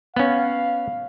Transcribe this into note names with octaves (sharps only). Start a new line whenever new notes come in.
B3 C#4 F5